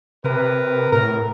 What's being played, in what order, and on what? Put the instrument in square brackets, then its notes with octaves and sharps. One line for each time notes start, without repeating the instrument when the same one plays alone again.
[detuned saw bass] C3 [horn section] A#4 B4
[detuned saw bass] A2 [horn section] A#4